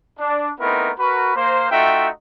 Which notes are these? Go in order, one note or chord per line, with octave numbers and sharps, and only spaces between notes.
D4
A3 B3 C4 D#4 E4 A#4
F#4 A#4 B4
A#3 C5
A3 D#4 F4 F#4 E5 G5